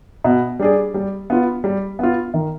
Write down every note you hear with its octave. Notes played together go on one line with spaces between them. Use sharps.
B2
G3 D4 G#4 D5
G3
B3 F4
G3
B3 F4
D#3